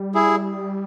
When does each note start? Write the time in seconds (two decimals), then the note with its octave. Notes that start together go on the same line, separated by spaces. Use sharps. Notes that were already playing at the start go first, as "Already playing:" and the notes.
Already playing: G3
0.14 E4 G#4